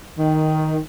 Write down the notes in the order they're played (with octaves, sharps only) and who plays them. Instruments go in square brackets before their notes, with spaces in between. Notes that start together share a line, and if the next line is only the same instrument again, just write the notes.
[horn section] D#3